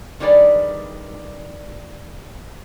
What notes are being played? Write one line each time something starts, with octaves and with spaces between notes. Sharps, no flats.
D#3 G3 D4 G#4 B4 D5